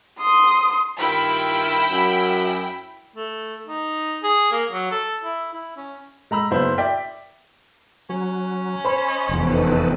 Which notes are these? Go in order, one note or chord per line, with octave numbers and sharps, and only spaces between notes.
C6 D#6
G2 D#3 E4 F4 G5 B5
F#2
A3
D#4
G#4
A#3
F#3
A4
E4
E4
C#4
G#3 A#5 B5 E6
F#1 B3 E4 C5 F5 B5
D5 E5 G5 B6
F#3 C#4
C5 B5
D#5
F1 E2
D#4 A4 B4